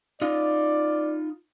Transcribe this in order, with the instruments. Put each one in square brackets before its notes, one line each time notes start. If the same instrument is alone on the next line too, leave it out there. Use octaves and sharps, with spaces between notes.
[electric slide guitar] D#4 F4 [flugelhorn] D5